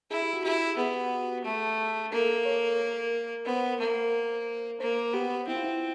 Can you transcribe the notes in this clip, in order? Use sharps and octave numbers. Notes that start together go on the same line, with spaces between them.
E4 G#4
G4
F#4
E4 G4
B3 G#4
A3
A#3 A4
C#5
A#4
B3 C5
A#3
A#3 C5
B3 G4
C4 E4
F4
E4